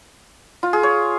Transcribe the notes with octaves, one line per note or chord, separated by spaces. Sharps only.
F4
G#4
C#5